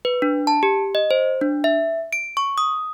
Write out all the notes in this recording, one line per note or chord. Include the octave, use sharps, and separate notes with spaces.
B4
D4
A5
G4
D#5
C5
D4
E5
D7
C#6
D#6